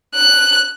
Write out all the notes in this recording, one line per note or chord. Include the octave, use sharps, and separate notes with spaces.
F#6